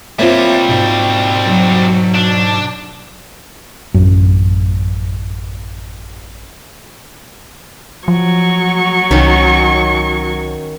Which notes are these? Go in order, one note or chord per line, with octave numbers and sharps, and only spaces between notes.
C3 G3 A#3 C4 F4 C#5 E5
G#2 B2
F#3
D4
A1 F#2
F3 F#3 C#6
C2 D#3 C#4